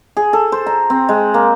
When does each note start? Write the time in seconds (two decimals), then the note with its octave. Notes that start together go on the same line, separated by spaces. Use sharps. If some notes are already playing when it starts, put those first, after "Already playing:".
0.17 G#4
0.33 A4
0.52 C5
0.67 A#5
0.90 C4
1.09 G#3
1.34 A#3